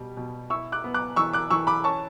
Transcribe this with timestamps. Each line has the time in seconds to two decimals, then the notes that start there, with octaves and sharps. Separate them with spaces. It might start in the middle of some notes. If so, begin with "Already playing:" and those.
Already playing: B2 G3
0.17 B2
0.50 E4 C#6 E6
0.72 D6 F#6
0.84 B3
0.94 D6 F#6
1.16 E3 C#6 E6
1.33 D6 F#6
1.50 E3 C#6 E6
1.67 B5 D6
1.84 C#4 A5 C#6